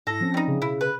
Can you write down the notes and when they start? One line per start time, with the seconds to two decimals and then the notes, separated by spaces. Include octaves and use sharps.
0.07 G#2 E4 A4 A#6
0.21 F3 C4 C#4
0.34 G3 D#4
0.48 C#3
0.62 B2 E4
0.81 B4